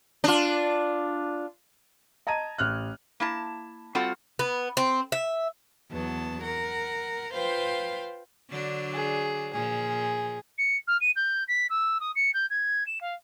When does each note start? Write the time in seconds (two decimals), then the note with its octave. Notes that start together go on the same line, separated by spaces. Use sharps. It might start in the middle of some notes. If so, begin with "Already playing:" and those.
0.24 D4 F4
2.27 D#5 A5 A#5 G#6 D#7
2.58 A1 F6 F#6
3.20 A#3 E4 A5
3.95 G3 C4 F4 F#4 A4 F#5
4.39 B3
4.77 C4
5.12 E5
5.91 E2 F#3 B3 A5
6.43 A#4 F#5
7.33 F4 B4 C5 F5 G5
8.50 D3 F#3 D4
8.94 G#4
9.53 A#2 F3 G#4
10.58 C#7
10.87 F6
11.01 D#7
11.16 G6
11.48 B6
11.70 E6
12.00 D#6
12.15 C#7
12.34 G6
12.50 G#6
12.87 E7
13.01 F5